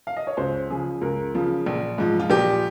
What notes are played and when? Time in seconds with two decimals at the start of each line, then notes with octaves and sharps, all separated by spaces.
0.07 F5
0.17 D#5
0.27 C#5
0.37 C#2 C5
0.70 C#3 F3 G#4
1.01 C#2 A#4
1.34 C#3 F3
1.66 A#1
1.98 G#2 F3
2.20 F4
2.30 A#1 G4